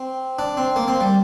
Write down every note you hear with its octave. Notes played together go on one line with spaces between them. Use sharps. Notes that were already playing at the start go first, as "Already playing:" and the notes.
Already playing: C4
D4
C4
A#3
C4
G3